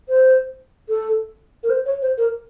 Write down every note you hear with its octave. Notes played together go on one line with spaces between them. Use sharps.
C5
A4
A#4
C5
C#5
C5
A#4